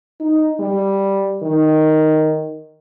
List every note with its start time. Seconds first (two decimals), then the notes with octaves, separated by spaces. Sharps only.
0.20 D#4
0.60 G3
1.43 D#3